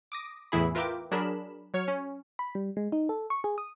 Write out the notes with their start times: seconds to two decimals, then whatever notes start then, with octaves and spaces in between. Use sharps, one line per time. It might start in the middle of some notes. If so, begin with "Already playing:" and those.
0.12 D6 D#6 A#6
0.52 E2 A2 E3 E4 G#4 B5
0.75 F4 A#4 B4 E5 G5 D6
1.11 F#3 D4 G#4 A#4 B5 E7
1.74 F#3 C#5 F6
1.88 C#4
2.39 B5
2.55 G3
2.77 G#3
2.92 D#4
3.09 A4
3.30 C#6
3.44 G#4
3.58 D#6